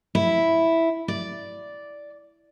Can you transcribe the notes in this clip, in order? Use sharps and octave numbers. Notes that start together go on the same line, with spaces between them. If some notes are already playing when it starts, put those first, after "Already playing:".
E4
D5